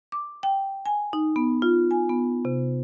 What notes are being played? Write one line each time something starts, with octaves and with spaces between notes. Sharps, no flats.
D6
G5
G#5
D#4
B3
F4
G#5
B3
C3